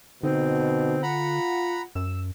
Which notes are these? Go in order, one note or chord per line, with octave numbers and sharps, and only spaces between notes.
B2 D3 C4 D#4
F4 F#5 A#5 B5
F#2 E6